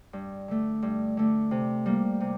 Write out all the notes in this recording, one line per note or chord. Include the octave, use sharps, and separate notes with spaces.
G2
D3 A3
G2
D3 A3
C3
G3 A#3
C3